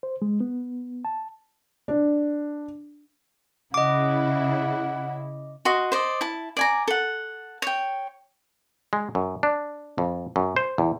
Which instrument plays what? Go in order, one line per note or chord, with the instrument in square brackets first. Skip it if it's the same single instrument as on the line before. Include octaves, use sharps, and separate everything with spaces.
[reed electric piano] C5
G#3
B3
A5
[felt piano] D4
[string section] C#3 E4 [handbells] D#5 D6 [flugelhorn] F#5
[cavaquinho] F#4 D#5 C6
C5 D5 D#5
E4 A5
D5 G#5 A#5
A4 F#5
C#5 G5
[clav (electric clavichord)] G#3
F#2
D4
F2
F#2
C5
E2